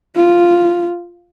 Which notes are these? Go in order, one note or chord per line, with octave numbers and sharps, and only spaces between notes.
F4